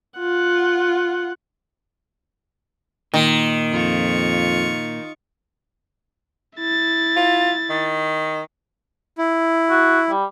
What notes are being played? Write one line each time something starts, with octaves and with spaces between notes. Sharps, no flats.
F4 F#5
A#2 D#3
F2 F4 C#6
E4 A6
F4
D#3
E4
F#4
G3